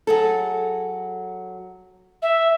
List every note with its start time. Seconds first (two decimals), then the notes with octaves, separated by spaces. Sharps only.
0.07 F#3 G#4 A4
2.22 E5